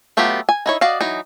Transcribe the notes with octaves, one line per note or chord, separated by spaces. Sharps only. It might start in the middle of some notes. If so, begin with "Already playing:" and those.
F#3 A3 B3 F4 G4
G#5
D#4 E4 C#5
F#4 D5 D#5 F5
E3 F#3 D#4